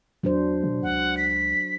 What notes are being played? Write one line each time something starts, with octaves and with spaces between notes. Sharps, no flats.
E2 F#3 D4 C5
B2
C#2 F#5
B6